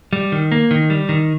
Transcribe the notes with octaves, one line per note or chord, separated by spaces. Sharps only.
G3
D#3
A#3
D#3
G3
D#3